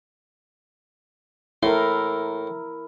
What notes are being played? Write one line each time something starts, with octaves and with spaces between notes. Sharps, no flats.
A2 E4 A#4 C6